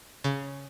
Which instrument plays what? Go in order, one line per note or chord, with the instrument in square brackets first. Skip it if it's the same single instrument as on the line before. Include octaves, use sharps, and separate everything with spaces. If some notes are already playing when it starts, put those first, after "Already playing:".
[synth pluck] C#3